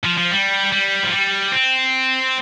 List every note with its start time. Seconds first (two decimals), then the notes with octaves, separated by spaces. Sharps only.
0.04 F3
0.18 F3
0.31 G3
0.72 G3
1.04 F3
1.12 G3
1.52 C4